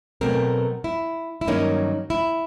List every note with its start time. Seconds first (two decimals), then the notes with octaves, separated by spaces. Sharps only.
0.21 B2 F#3 A3 C4 A#4
0.84 E4
1.41 E4
1.47 G2 D#3 F#3 A#3 C#4 D#4
2.10 E4